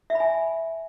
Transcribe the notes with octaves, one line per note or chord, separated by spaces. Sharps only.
E5
B5
G#5